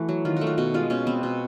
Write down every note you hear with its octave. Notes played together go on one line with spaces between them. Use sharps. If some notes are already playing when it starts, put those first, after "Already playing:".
Already playing: E3 A3 F#4
F#3
D#3 F4
A3 F#4
F4
B2 F#4
G#3 F4
B2 C#4
B3 C4
B2